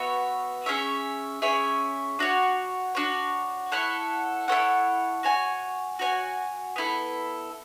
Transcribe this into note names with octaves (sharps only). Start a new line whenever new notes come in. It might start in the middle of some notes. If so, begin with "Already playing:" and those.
Already playing: B3 F#4 C#5 E5
C#4 G#4 C#5 E5
C#4 G#4 C#5 E5
D4 F#4 C#5
D4 F#4 C#5
E4 A4 C#5 F#5
E4 A4 C#5 F#5
F#4 C#5 G#5
F#4 C#5 G#5
B3 E4 A4